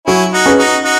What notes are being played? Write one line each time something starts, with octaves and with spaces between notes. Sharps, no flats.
F#3 C#4 E4
D#4 F#4
C#4 G#4 B4
D#4 F#4
D#4 F#4